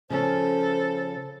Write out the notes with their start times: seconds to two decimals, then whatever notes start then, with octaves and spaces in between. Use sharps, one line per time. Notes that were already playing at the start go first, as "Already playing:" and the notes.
0.10 C#3 F3 C#4 A4 C5